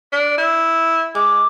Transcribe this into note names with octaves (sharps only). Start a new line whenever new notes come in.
D4
E4
G#3 D6